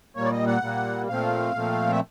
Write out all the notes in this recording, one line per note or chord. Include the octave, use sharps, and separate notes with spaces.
A#2 G3 A#3 C#5
D5
D#5
F#5
A#2 G3 A#3
A#2 F3 A3 C4 F5
A#2 F3 A3 C4
E5